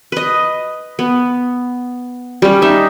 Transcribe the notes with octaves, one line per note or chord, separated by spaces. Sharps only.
B4 D#5
B3
G3 C#4
D#4 E5